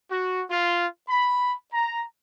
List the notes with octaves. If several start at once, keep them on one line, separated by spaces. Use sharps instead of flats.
F#4
F4
B5
A#5